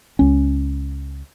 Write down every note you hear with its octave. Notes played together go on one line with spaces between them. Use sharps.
C#2 C#4